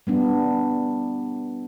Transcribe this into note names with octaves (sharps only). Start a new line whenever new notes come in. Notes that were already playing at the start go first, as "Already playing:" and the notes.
G3 B3 D4